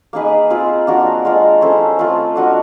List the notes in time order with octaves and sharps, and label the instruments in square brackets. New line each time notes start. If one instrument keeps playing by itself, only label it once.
[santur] A#3 D#4 G#4 B4
C4 F4 G#4 C5
A#3 D4 F#4 A#4
G#3 C4 F4 A#4
C#4 E4 A4 C5
A3 C4 F4 A4
D4 F#4 A#4 D#5